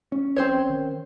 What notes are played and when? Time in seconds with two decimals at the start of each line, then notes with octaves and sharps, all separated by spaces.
0.12 C#4
0.36 A#1 C4 C5 C#5
0.70 D#3